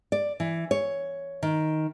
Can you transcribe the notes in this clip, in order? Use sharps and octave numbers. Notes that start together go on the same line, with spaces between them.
D5
E3
C#5
D#3